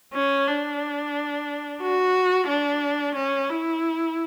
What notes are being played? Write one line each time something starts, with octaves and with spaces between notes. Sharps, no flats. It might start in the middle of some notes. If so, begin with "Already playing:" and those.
C#4
D4
F#4
D4
C#4
E4